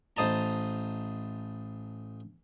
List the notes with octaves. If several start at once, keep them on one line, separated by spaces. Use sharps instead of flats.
A1 C5 D#5 A5 A#5